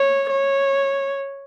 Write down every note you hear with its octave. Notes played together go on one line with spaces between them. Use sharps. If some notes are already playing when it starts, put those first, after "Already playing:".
Already playing: C#5
C#5